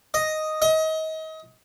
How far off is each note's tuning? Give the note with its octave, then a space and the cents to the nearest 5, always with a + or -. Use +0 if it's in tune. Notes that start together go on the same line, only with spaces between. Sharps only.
D#5 +0
D#5 +30